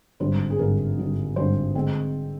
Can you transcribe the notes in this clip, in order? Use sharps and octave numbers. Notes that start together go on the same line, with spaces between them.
G#1 G2 D3 G3 D4 C5
G#4
G#1 G2 D3 G3 D4 A#4
G#1 G2 D3 G3 D4
G#1 G2 D3 G3 D4 C5
D3 G#3 C4